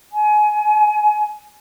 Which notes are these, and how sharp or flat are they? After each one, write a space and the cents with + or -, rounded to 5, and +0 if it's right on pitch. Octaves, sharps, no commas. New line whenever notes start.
G#5 +25